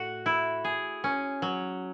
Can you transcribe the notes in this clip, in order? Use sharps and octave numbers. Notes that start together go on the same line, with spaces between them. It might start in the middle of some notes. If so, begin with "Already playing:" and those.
Already playing: A2 F#4
E4
G#4
C#4
F#3